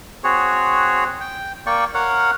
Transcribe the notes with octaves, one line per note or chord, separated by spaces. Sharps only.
C4 F#4 G#4 C#5
G5
A#3 D5 G5 C#6
A#4 C#5 F5 F#5